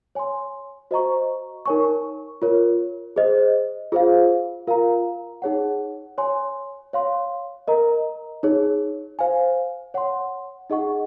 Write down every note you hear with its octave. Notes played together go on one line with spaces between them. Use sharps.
C#5 G#5 C6
F#4 C5 D#5 A#5 C#6
D#4 A#4 C#5 G#5 C#6
F4 A#4 C#5
G#4 C5 D#5
F4 G#4 C5 F5
F4 A#4 F5 A#5
D#4 G#4 C#5 F#5
C#5 G#5 C6
C#5 F5 C6
A#4 D#5 A#5
D#4 G#4 C#5
C5 F5 G#5
C#5 F#5 C6
D#4 G#4 D#5 F#5 C#6